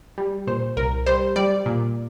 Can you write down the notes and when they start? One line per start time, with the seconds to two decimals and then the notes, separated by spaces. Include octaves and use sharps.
0.18 G3
0.47 A#2 C5
0.77 C2 A#4
1.06 G3 C5
1.36 G3 D5
1.66 A#2